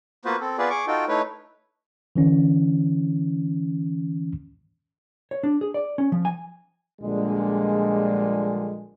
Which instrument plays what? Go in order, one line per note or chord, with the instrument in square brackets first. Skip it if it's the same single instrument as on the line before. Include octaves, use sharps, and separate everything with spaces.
[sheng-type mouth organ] A#3 B3 F4 F#4 B4 C5
C4 A4
B3 F4 G#4 B4 D5
G#4 C#6 D6
D#4 F4 F#4 A4 G5
A3 D#4 E4 B4 C#5
[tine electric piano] D3 E3 C#4
[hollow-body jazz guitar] C#5
D4
G#4
D5
C#4
F3
G#5
[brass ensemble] A#1 A#2 D3 G3 G#3